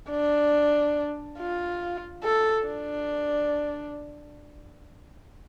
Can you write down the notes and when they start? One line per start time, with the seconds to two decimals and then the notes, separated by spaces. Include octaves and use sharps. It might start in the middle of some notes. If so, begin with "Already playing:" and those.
0.10 D4
1.39 F4
2.24 A4
2.67 D4